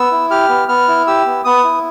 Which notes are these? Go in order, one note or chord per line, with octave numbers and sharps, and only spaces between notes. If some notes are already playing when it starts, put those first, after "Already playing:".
Already playing: B3 E6
E4
G4 F6
B3
B3 F6
E4
G4 E6
B3
B3 D#6
E4